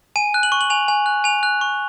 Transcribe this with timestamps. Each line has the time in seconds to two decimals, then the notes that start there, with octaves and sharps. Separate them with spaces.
0.16 G#5 D#7
0.34 F#6
0.43 F#7
0.52 C#6
0.61 F#7
0.70 G#5 F7
0.88 G#5
1.06 F#6
1.24 G#5 F7
1.43 F#6
1.61 C#6